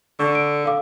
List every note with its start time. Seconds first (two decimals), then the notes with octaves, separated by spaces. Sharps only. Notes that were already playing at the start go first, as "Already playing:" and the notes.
0.19 D3 C#6
0.35 D7
0.64 A4 F5 D6